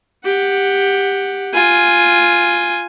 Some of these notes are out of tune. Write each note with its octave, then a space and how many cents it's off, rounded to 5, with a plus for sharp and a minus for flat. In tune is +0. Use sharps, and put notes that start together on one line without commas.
G4 +10 F#5 +5
F4 +0 G#5 +0